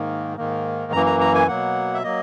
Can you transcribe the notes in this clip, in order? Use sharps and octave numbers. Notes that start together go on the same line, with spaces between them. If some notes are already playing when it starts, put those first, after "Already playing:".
Already playing: G#2 D#3 A#3
G#2 D#3 A#3
F#2 E3 A#3 A#5
A#5
A#5
G#5
B2 F#3 A#3 F#5
E5
F#3 A#3 D#5